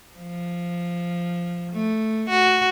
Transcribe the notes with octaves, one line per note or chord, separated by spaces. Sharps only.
F3
A3
F#4